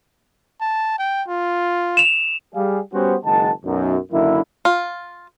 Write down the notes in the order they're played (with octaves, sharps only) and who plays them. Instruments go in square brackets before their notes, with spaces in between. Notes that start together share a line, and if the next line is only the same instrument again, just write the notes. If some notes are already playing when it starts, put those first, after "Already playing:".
[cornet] A5
G5
F4
[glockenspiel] E7 F7
[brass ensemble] G3 G#4 F5
G3 B3 C#4 F#4 G4 C5
F#1 D#3 G#3 D#4 F#5 A5
B1 F#2
F#2 D3 D#3 A#3 E4
[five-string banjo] F4